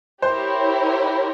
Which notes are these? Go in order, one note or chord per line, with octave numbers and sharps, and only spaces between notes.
E4 G4 A#4 C5 C#5